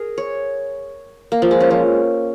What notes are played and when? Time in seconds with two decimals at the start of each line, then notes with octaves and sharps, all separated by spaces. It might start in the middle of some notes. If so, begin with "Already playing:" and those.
Already playing: G#4 A#4
0.18 C#5
1.32 A#3
1.42 F3
1.51 G#3
1.60 C#4
1.71 F3